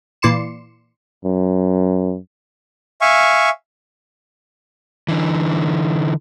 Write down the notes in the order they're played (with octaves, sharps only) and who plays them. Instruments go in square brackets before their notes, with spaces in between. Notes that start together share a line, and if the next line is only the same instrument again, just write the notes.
[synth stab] A#2 E3 D5 C6 C#7 E7
[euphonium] F#2
[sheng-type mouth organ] E5 F5 G#5 C#6
[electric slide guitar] D3 E3